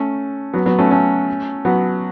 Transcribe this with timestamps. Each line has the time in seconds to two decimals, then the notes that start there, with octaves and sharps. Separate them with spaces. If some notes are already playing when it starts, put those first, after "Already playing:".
Already playing: A3 C#4
0.54 F#3 B3
0.66 F#3 B3
0.79 A3 C#4
0.91 A3 C#4
1.65 F#3 B3